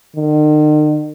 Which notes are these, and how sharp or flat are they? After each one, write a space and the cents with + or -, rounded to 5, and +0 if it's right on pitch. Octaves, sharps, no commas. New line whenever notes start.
D#3 -45